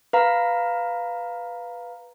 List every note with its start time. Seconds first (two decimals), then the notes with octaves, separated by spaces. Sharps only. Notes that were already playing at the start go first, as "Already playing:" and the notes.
0.13 B4 F5 A#5